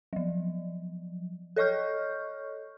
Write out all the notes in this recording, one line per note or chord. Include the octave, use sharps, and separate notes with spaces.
F3 F#3
A4 C#5 D#5 C#6 F6 G6